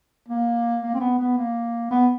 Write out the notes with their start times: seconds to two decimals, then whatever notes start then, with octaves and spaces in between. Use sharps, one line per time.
0.29 A#3
0.83 A#3
0.95 C4
1.00 B3
1.19 B3
1.37 A#3
1.91 B3